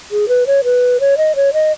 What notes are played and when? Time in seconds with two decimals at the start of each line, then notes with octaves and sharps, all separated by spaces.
0.11 G#4
0.28 B4
0.47 C#5
0.64 B4
1.00 C#5
1.17 D#5
1.35 C#5
1.53 D#5